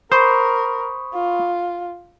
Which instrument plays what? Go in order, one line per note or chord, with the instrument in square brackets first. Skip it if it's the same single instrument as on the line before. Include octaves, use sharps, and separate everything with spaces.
[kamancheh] A#4 [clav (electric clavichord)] C5 [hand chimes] B5 C#6 D#6
[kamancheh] F4